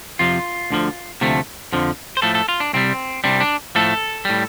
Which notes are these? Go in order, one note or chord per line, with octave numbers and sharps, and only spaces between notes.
F2 C3 F3 F4
D2 D3 F3
D2 C3 F3 A3
F2 D3 F3
C5
A2 F3 A3 A4
A4
F4
D4
C2 C3 G3 C4
C2 C3 G3 D4
D4
A2 F3 A3 A4
A2 G3